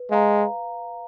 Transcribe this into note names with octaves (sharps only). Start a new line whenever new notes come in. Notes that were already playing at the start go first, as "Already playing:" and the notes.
Already playing: B4
G#3 F5 A#5